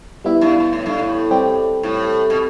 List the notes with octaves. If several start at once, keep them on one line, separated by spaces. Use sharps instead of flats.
G3 B3 E4
G2
B2
A2
G2
A2
G3 C4 G4
A2
B2